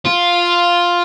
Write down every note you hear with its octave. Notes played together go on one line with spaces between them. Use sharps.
F4